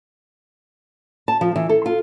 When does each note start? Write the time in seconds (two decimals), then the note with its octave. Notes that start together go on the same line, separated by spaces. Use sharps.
1.28 A5
1.41 F3
1.56 E3
1.69 A4
1.86 F4